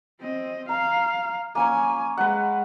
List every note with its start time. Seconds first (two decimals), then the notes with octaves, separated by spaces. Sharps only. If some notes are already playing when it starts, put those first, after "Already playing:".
0.19 C4 D#5
0.69 F5 A#5
1.55 A#3 C#4 C#5 G#5
2.17 G#3 B4 F#5